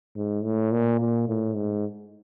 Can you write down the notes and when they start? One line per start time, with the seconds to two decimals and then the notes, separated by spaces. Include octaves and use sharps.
0.16 G#2
0.44 A2
0.72 A#2
1.00 A#2
1.28 A2
1.56 G#2